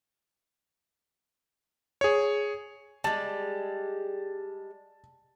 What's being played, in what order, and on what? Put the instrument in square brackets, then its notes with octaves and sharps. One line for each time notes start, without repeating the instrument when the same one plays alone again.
[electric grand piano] G#4 C#5
[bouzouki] G3 G#3 [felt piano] A5